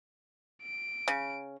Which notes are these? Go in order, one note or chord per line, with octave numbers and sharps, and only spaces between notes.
D7
C#3